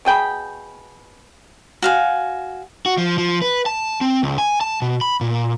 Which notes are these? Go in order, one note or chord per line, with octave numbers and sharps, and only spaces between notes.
B2 G#4 G5 B5
F#4 F5 G#5
F#4
F3
F3
B4
A5
C4
C#2
G#5
A5
B2
B5
A#2